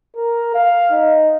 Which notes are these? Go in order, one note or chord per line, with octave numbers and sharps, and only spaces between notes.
A#4
F5
D#4